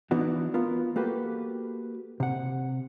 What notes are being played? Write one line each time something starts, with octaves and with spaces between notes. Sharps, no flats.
E3 B3 D4 D#4 F#4
B3 F4 A#4
A#3 F#4 G4 A4 B4
C3 F#5